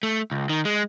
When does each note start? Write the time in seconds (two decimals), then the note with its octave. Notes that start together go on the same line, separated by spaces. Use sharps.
0.03 A3
0.32 C#2
0.50 D#3
0.65 G#3